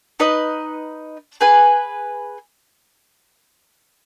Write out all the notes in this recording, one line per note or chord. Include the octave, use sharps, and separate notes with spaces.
D#4 B4 D#5
G#4 B4 G#5